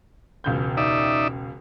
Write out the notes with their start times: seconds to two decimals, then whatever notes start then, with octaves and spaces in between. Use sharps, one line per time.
0.44 E1 C#2 G6
0.77 D#4 D5 E5